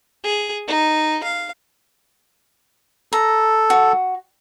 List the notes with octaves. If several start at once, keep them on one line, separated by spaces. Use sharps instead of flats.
G#4
D#4
F5
A4 A#5
F#4